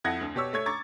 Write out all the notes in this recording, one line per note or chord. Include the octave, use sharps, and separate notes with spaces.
F2 E4 F#5 G#6 A#6
D2
B2 G4 C#5 E6
A3 C#5 G#6
A#5 C#6 D6 G#6 A6